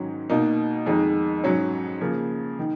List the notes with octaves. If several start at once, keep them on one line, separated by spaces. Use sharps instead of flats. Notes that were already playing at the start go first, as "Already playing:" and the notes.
Already playing: G#2 D#3 F#3 C#4
B2 A#3 D#4
F2 D#3 G#3 D#4
G#2 F#3 C#4
C#3 F3 A#3
D#3